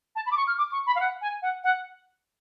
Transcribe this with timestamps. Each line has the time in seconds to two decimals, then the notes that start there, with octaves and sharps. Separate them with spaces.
0.16 A5
0.26 B5
0.31 D6
0.37 C#6
0.47 F6
0.58 D6
0.72 C#6
0.87 B5
0.95 F5
1.00 F#5
1.21 G#5
1.42 F#5
1.64 F#5